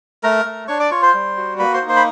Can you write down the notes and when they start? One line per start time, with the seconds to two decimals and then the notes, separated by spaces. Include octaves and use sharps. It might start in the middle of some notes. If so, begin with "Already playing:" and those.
0.23 A3 A#4 A#5
0.45 A3
0.68 D4 C#5 C#6
0.80 D5 D6
0.91 F4 C#5 C#6
1.02 C5 C6
1.14 G3
1.37 F#4
1.59 A#3 B4 B5
1.74 C5 C6
1.82 D#4
1.89 C5 C6
1.96 B5